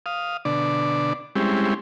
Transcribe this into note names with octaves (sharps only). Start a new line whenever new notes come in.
F5 D#6
B2 D3 D4 D5
G3 G#3 C4 C#4 E4 G4